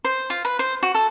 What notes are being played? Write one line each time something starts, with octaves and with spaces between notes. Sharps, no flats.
C5
F4
B4
C5
F#4
A4